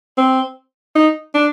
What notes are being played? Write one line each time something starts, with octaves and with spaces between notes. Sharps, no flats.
C4
D#4
D4